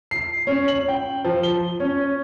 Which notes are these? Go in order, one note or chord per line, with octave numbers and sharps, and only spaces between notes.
C7
C#4
F#7
G5
F3
G7
C#4